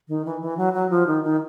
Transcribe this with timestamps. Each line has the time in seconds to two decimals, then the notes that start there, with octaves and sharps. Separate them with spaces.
0.08 D#3
0.25 E3
0.41 E3
0.57 F#3
0.74 F#3
0.90 F3
1.07 D#3
1.24 D#3